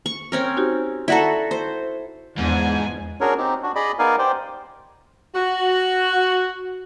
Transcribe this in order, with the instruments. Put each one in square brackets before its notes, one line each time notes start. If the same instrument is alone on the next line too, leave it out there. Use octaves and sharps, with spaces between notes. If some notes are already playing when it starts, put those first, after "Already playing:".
[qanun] C#6
C4 C#4 A#4
[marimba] D#4 F#4 G4
[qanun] E4 F#4 A4 [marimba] D5 F#5 A#5
[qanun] C5
[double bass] E2 [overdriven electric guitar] G#2 [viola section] F3 D4 G#5
[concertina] C#4 D4 F#4 G#4 A#4 C#5
C4 D#4 G4
D4 F#4
G#4 D5 D#5 B5
B3 D#4 A#4 D5 F5 G#5
G4 C5 D5 G5
[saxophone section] F#4